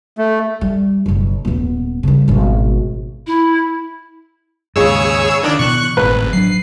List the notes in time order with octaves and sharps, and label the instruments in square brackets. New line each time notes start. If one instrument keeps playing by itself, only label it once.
[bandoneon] A3
[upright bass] G3
F#1 B1
D#1 B3
C#3 G3
G#1 B2
[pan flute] E4
[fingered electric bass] D#2 G#2 [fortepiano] C#3 G#3 [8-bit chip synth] G#4 C#5 E6
[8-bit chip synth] D#3 D4 D5
[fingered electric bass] B2 E3 [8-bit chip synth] C#6 F#6
[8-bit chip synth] G#1 [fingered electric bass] A2 [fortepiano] B4
[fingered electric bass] F#3 D4 [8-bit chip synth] C7